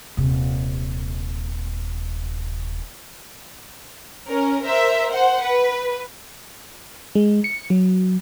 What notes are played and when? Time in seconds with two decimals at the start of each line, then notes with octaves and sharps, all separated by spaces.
0.17 D#1 C3
4.27 C#4 A#4
4.62 A#4 C5 E5
5.11 C5 F#5
5.43 B4
7.15 G#3
7.44 C#7
7.70 F#3